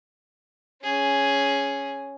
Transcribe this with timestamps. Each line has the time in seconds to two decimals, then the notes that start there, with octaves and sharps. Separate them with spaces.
0.82 C#4 G#4